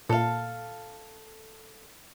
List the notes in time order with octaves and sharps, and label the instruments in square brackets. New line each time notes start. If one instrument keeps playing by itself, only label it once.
[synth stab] A#2 [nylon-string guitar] A4 F5